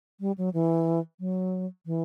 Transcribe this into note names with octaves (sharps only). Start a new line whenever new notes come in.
G3
F#3
E3
F#3
E3